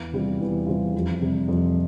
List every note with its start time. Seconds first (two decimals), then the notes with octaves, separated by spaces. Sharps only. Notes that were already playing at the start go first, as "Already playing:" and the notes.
Already playing: E2
0.13 C3 G3 C4 F4
0.40 E2
0.67 C3 G3 C4 F4
0.94 F2
1.22 C3 G3
1.48 F2